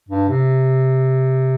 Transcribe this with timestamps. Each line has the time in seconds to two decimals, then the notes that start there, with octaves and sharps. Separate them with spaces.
0.08 G2
0.28 C3